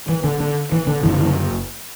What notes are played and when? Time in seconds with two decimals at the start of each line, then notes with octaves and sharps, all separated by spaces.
0.09 E3
0.24 D3
0.40 D3
0.72 E3
0.87 D3
1.03 F#1 F#2 D3 E3
1.20 E3